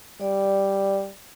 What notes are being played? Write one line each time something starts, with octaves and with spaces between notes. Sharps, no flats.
G3 D5